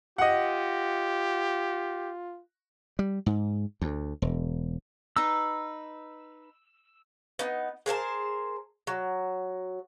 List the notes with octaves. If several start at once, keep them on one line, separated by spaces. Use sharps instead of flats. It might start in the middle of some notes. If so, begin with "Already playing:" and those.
F4 G4 D#5 F#5
G3
G#2
D2
E1
D#4 B4 A#5 E6
B3 D#4
G#4 A#4 C5 A5
F#3